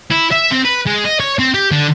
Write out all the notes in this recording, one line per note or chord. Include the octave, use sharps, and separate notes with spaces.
E4
E5
C4
B4
G#3
D#5
C#5
C4
G4
D3